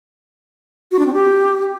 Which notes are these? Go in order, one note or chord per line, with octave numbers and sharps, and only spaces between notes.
F#4
D4
C4
G4